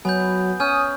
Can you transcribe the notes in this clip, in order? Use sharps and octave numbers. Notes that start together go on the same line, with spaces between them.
F#3 B3 G#5 B5 G6
C#4 G#5 D#6 F6 G6